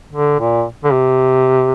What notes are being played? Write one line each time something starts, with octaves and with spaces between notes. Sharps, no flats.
D3
A#2
D3
C3